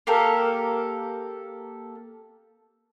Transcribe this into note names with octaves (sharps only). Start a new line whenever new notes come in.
A#3 G4 A4 A#4